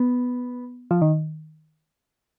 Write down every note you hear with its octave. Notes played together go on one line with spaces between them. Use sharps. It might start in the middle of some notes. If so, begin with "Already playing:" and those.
Already playing: B3
F3
D#3